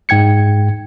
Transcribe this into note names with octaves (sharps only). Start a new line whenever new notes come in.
G#2 G5 G#6 C#7